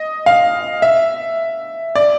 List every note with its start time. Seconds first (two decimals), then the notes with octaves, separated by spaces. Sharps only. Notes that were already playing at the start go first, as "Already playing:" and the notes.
Already playing: D#5
0.26 F5
0.82 E5
1.95 D5